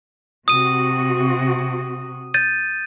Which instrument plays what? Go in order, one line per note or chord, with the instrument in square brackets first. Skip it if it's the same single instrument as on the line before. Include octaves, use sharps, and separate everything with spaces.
[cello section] C3 F#4 [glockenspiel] D#6 D#7
[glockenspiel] G6 A6 D#7